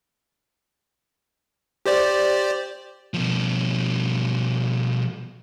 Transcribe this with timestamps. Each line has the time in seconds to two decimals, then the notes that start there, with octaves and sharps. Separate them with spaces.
1.86 G4 C5 D5
3.14 B2 F3